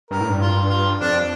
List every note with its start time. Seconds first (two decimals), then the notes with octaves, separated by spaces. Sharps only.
0.11 G2 A#4
0.20 A2
0.30 G2
0.41 F4
0.70 F4
1.01 F2 D4